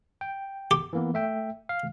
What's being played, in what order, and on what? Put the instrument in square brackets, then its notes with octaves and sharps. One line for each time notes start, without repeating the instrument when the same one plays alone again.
[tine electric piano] G5
[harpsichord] G4
[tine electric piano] E3 A#3 B3
A3 E5 G5
F5